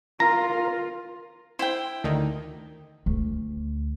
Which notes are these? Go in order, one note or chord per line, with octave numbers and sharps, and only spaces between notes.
F4 A#4 A#5
E4 C5 G5
D2 D#3
D2